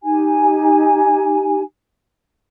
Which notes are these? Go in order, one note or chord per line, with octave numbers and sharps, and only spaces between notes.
D#4 G4 G#5